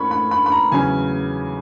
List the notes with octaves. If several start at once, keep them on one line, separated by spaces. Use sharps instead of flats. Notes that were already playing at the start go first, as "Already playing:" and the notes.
Already playing: G#2 E3 A#3 C#4 B5 C#6
B5
B5
B5
A#5
E2 C#3 F#3 C#4 G#5